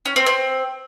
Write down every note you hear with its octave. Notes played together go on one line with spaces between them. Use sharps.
C#4
C4
C4